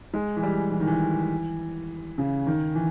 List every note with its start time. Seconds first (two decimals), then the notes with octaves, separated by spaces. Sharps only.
0.14 G#3
0.36 E3
0.43 G3
0.72 E3
0.80 D#3
0.87 E3
2.18 C#3
2.47 D#3
2.75 E3